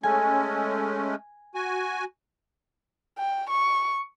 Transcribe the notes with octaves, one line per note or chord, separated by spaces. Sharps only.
G#3 A3 C#4 G#5
F#4 G#5
G5
C#6